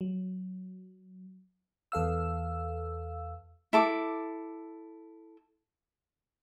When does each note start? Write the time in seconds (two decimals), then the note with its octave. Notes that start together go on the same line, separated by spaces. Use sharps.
0.01 F#3
1.92 E2 A4 F5 E6
3.73 E4 A4 D6